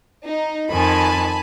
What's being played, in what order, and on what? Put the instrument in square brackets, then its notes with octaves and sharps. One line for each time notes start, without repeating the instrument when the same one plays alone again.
[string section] D#4
[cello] F2 D#3 [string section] G#5 A5 B5